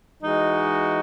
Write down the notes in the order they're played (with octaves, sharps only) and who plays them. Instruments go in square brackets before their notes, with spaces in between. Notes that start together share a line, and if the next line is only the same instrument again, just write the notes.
[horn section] E3 G#3 D#4 F#4